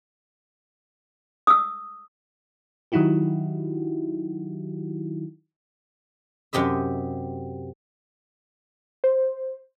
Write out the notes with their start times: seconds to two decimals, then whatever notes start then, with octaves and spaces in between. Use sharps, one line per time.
1.47 D#6 E6
2.92 D#3 F#3 D#4 E4 F#4 G4
6.53 F#2 C3 G4 D#5 E5
9.04 C5